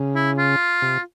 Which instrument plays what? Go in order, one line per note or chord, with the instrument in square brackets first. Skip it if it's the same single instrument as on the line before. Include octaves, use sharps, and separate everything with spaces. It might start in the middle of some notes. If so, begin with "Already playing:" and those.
Already playing: [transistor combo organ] C#3
[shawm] E4
F4
[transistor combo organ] C3